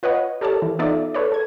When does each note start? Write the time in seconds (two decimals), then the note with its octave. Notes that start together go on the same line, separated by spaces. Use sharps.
0.03 F4 B4 C#5 D#5 F#5
0.41 G4 A4 A#4 C#5 D5 A5
0.62 E3
0.79 B3 D#4 F4 A4 D5 E5
1.14 A4 B4 C#5 D5
1.32 A4 G#6